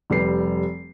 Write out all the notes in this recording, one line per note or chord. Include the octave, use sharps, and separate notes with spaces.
F1 G3 B4 C7